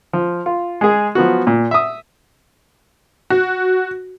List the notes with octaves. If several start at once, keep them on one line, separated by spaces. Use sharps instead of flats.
F3
F4
G#3 G#4
F3 F#3 B3 F#4
A#2
E5 D#6
F#4